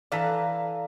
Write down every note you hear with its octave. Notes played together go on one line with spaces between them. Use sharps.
E3 A4 B4 D5 F5 A#5